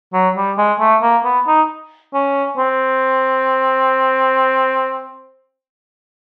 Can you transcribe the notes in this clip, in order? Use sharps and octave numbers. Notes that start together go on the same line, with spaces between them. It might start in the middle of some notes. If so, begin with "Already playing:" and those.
F#3
G3
G#3
A3
A#3
B3
D#4
C#4
C4